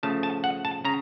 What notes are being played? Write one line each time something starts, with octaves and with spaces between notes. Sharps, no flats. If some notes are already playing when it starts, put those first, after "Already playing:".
C#3 F3 A3 A5
A5
F#5
A5
C#3 A#5